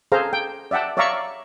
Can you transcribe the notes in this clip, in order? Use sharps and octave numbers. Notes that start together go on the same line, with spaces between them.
G#4 A4 C5 F5 A#5
G5
D5 E5 F#5 G5 A5
C#5 D5 E5 F5 A#5 C#6